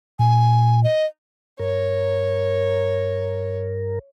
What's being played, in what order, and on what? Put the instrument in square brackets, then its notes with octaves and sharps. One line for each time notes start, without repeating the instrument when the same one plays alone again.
[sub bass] A#2 [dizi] G#5
[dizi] D#5
[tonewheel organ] G2 A#4 [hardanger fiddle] C#5